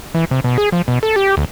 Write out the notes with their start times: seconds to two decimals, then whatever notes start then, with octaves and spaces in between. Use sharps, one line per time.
0.14 E3
0.31 C3
0.44 B2
0.58 G#4
0.72 F3
0.88 B2
1.03 A4
1.16 G4
1.37 D2